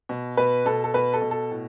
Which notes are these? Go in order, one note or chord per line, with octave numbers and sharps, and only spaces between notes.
B2
B2 B4
B2 A4
A4
B2 B4
A4
B2
A4
A2